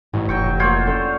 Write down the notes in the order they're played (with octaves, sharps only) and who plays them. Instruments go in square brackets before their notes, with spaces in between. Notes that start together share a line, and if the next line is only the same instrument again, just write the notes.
[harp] A1 [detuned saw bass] G#2
[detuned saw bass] F1 [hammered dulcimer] F#3 G5 C#6
[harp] A#3 F#5 G5 [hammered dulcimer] F4 C5 C#5
[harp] C#4 A4 D5